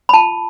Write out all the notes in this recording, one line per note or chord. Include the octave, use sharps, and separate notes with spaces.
B5
F4 A5